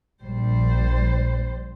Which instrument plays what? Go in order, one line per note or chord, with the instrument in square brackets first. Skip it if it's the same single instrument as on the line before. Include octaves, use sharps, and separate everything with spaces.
[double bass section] A#1 [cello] G3 C5